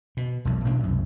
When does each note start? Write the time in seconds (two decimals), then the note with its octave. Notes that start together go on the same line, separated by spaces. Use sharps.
0.17 B2
0.45 E1 B1
0.65 A1 B2 D4
0.83 C2 F#2